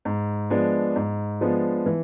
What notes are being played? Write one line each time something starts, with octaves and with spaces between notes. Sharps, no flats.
G#2
F3 G#3 B3 D4
G#2
F3 G#3 B3 D4
E3